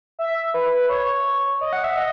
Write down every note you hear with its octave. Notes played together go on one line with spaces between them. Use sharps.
E5
B4
C#5
D#5
F#5
E5
D#5